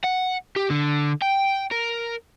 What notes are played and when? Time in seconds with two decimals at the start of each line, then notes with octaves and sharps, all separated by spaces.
0.04 F#5
0.56 G4
0.70 D3
1.22 G5
1.71 A#4